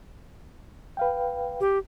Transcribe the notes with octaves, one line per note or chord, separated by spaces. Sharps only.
B4 F5 G5
G4